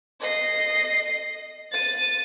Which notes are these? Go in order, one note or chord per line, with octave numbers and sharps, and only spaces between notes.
D#5 C7
A6 D#7